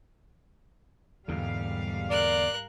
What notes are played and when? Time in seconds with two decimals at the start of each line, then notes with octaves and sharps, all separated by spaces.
1.28 E2 G#2 D3 G3 F5
2.10 A#4 D5 F#6